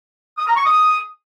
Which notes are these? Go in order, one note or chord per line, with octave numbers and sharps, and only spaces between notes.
D#6
A#5
C#6
D#6